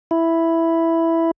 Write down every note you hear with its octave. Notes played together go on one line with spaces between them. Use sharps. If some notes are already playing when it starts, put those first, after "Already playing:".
E4